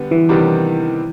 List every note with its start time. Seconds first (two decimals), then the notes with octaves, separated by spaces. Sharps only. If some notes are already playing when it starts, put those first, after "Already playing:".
Already playing: D3 G3 B3
0.11 E3
0.29 C3 D#3 G3 B3 D4